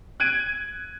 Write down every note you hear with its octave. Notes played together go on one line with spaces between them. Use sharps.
F#6 G#6 D7 D#7